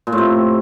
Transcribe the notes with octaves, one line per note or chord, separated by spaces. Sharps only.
A#2
A2
C3